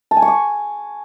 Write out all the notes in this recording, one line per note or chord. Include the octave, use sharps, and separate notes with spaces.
A5
G#5
C#6
D6